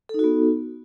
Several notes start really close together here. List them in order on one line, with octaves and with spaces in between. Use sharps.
A4 D#4 F#4 B3